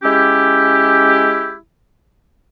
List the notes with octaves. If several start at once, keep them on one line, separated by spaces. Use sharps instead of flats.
G#3 C#4 E4 G4